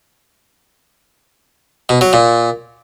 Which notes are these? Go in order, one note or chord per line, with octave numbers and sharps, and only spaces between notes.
B2
F#3
A#2